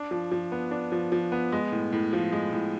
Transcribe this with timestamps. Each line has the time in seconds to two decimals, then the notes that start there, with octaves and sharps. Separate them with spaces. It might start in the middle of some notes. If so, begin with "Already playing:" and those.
Already playing: D4
0.11 F3
0.32 F3
0.52 B3
0.71 D4
0.92 F3
1.12 F3
1.32 B3
1.52 G#3
1.72 A2
1.93 A2
2.13 F3
2.32 G#3
2.53 A2